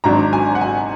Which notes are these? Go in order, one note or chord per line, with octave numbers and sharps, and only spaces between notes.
G#1 G#2 F#3 D4 A#5
G#5
F#5
G#5